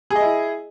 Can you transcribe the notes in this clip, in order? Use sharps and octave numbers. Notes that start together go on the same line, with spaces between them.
E4 G#4 D#5